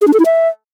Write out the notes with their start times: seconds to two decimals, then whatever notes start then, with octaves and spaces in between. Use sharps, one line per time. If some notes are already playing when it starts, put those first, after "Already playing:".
0.01 G#4
0.07 D4
0.13 A4
0.19 E4
0.25 E5